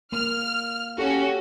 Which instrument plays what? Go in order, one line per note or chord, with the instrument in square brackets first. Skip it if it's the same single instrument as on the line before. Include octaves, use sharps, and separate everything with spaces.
[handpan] A#3 [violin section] F6
[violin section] C#4 F#4 [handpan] G4 A4